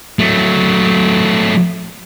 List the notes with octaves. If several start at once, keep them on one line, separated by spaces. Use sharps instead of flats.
F#3 A3